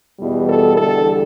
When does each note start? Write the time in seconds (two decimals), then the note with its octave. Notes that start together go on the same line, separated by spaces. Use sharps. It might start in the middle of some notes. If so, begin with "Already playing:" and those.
0.18 E2 B2 G3
0.48 A4
0.77 E2 D3 G3 A4